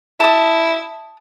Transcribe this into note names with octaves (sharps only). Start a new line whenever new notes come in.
E4 A5 D#6